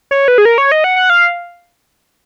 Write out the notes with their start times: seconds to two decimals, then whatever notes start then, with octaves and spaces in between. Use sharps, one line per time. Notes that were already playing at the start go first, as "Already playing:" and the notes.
0.11 C#5
0.28 B4
0.38 G#4
0.45 A#4
0.58 C#5
0.72 D#5
0.84 F#5
0.96 F#5
1.10 F5